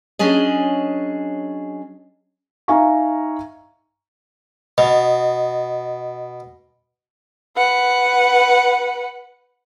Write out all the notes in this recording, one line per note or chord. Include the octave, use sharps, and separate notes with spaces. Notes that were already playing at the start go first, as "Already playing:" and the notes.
F#3 C#4 D4 G#4 D#5
D#4 E5 F5 G#5 A#5 C#6
B2 D#5
B4 F#5